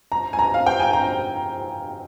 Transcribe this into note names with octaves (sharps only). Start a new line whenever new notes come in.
A#5
G#5
A#5
F5
G5
G#5
A#5